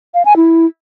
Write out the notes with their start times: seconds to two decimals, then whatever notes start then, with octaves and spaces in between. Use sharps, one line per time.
0.14 F5
0.25 G#5
0.36 E4